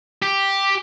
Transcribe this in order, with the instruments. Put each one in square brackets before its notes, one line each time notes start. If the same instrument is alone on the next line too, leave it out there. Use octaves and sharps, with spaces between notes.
[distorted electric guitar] G4